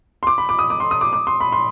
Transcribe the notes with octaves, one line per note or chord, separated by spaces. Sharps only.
C6
D6
B5
D6
D#6
D6
C6
D#6
D6
D6
C6
B5
C6